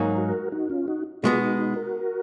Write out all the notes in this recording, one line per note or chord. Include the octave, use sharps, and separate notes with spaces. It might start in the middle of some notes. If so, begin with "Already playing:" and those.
Already playing: G#2 F#3 A#3 D#4
F#4 A#4
D#4 F#4
C#4 F4
D#4 F#4
B2 G#3 B3 F4 G#4
D#4 F#4
D#4 F#4
F#4 A#4